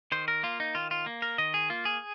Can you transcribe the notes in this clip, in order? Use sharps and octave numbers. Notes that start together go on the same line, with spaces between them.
D#3 C5
A#4
A#3 F4
D#4
D#3 F4
F4
A#3
A#4
D#3 D#5
G#4
A#3 F4
G#4